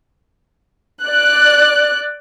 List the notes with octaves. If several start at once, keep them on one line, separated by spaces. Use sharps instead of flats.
D5 F#6